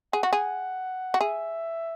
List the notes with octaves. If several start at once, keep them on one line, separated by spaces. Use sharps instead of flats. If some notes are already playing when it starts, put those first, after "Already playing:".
G#4 F#5
F#4
G#4
F#4
G#4 E5